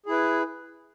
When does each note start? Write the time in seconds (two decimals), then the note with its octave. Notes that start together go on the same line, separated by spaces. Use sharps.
0.06 G#4
0.09 E4
0.11 B4